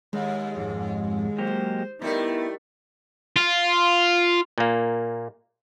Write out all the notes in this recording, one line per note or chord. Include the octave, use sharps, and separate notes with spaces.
D#2 G#3
F2 G#2
F#3 A#3 G4 C5
D#3 G3 A3 B3 E4
F4
A#2 A#3